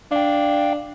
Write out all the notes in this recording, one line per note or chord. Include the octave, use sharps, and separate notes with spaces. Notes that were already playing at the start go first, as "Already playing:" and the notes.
D4 F5 G5